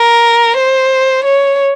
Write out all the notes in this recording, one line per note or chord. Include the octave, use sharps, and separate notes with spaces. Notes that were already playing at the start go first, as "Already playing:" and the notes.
Already playing: A#4
C5
C#5